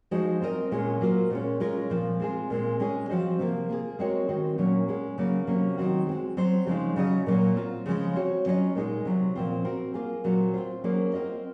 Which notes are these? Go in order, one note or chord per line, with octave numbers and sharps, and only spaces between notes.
F3 G#3 D#4 F#4 C5
C4 F4 A#4 D#5
A#2 G#3 C#4 F4 G#4
F#3 A#3 F4 C5
A#2 G#3 C#4
G#3 C#4 F4 A#4
A#2 F3 C4
G#3 C4 F4 G#4
A#2 G#3 C4
G#3 C#4 G#4
F3 C4 F#4 C5 D#5
C3 F3 A#3
A#3 F4 G#4
G#3 C4 F#4 A#4 C#5
D#3 G#3 C4 F#4
A#2 F#3 A#3 C#4
G#3 C#4 G#4
C#3 F#3 A#3
C3 F#3 A#3 C#4
D#3 F#3 C4 F#4
G#3 C4 F#4
F#3 C4 F#4 C5
C#3 F3 G#3 C4 D#4
C#3 F#3 C#4 G#4 D#5
A#2 F#3 A#3
C4 F4 A#4
C#3 F3 G#3 C4
C4 F#4 C#5
F#3 C#4 F4 C5 D#5
A#2 G#3 D#4 G#4
C3 F#3 C4
A#2 F3 C4 F4 C5
C4 F#4 A#4
A#3 F4 G#4
A#2 F#3 C4
C4 F4 C5
F#3 A#3 C#4 G#4 C5
C4 F4 A#4 D#5